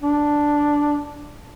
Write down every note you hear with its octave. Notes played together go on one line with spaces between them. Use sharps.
D4